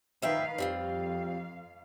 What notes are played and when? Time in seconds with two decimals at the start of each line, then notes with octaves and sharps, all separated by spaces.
0.22 D#3 F3 B4 E5 F5 G5
0.58 F2 G3 C4 F4 F5